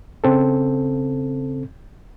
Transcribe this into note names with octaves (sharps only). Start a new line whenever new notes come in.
C#3 C4 A4